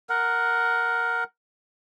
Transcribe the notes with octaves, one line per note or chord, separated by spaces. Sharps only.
A#4 F#5